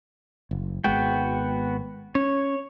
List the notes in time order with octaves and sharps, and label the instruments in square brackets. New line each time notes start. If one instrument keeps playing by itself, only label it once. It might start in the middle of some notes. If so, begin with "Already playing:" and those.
[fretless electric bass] F#1
[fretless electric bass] G#1 G#3 [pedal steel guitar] B3 F#4 G5
[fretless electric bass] C#4 [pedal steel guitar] C#5